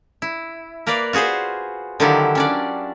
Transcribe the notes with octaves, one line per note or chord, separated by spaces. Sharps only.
E4
A#3 A#4 B4 D5 F5
F4 F#4 G#4 B4 C5
D3 D#3 F#3 E4 F4 G4
C#4 D4 D5